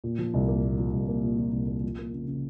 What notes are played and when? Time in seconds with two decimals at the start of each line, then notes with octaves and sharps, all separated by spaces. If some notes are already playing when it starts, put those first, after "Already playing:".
0.04 A#2
0.19 F3
0.34 C2
0.48 A#3
0.63 A#2
0.79 F3
0.93 C2
1.09 A#3
1.24 A#2
1.38 F3
1.53 C2
1.68 A#3
1.84 F3
1.99 A#3
2.14 C#3
2.28 C#3